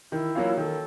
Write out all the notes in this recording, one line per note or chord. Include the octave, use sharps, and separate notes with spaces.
D#3 E4
F#3 A#3 C#4 F4
D#3 A4